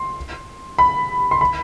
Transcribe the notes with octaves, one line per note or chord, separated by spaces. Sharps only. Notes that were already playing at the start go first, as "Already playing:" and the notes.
Already playing: C6
B5
C6
B5